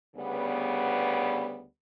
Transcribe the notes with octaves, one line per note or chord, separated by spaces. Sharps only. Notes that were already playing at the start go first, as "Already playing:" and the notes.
D2 C#3 G3 B3